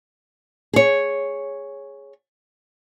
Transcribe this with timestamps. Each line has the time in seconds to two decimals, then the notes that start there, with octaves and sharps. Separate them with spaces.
0.73 G#4 C#5